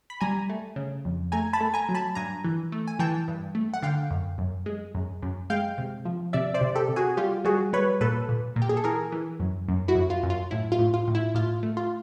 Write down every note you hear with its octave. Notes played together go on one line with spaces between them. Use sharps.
B5
G3 G#5 A#5
A3
C#3
F2
A3 G#5 A#5
A5 B5
A3
G#5 A#5
F#3
A5 B5
G2 G#5 A#5
E3
A3
G#5
E3 G5 A5
G2
A3
F#5
D3 F5 G5
F#2
F#2
G#3
F#2
F#2
G#3 F5 G5
C3
F3
C3 D5 E5
C5 D5
C3
G4 A4
C3
F#4 G#4
G3 F4 G4
G3 F#4 G#4
G3 B4 C#5
A#2 A4 B4
A#2
A#2
G4
G#4
A4
E3 G#4 A#4
E3
F#2
F#2
E4 F#4
F#2
F4
F#2
F4
A2 E4
F4
A2
F4
A2
E4
A2 F4
A3
F4